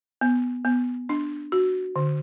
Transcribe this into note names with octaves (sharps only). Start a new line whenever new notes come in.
B3
B3
D4
F#4
D3